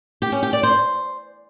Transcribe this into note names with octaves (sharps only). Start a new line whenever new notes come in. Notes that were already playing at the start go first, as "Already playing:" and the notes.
G4
C#4
G4
D5
C5